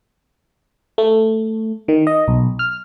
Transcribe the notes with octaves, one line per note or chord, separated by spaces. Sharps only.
A3
D#3
D#5
B1
F6